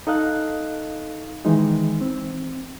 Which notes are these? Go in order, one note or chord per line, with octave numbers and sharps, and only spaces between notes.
D#4 A4 D#5 F5 F#6
D#3 E3 G#3 D#4
C4